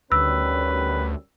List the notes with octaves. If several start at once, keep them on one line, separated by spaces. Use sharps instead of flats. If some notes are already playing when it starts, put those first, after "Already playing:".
D2 D#3 G3 C#4 B4 E6